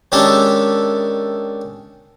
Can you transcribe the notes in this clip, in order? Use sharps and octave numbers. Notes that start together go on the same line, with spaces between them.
D#3 G#3 C#4 D4 G4 A4